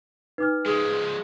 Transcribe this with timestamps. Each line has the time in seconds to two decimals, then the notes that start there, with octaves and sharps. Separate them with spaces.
0.38 D#4 B4 D6 F6
0.66 F3 G#3 G#4 D#6